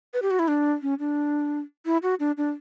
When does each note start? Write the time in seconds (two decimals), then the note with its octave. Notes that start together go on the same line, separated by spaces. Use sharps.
0.14 B4
0.22 G4
0.31 F#4
0.39 E4
0.48 D4
0.82 C#4
0.99 D4
1.86 E4
2.03 F#4
2.20 D4
2.37 D4